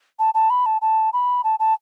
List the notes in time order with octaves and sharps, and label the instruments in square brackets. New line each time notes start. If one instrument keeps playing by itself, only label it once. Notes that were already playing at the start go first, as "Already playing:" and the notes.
[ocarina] A5
A5
B5
A5
A5
B5
A5
A5